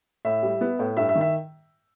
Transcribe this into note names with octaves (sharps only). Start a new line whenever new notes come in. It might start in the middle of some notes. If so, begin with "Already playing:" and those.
A2 E5
G3
B3
A2
G2 E5
E5
D#3
E5